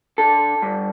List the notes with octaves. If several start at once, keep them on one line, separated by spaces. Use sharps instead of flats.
D3 A4
G2